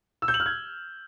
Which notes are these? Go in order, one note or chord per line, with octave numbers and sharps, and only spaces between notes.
E6
G6
F#7
F6
G#6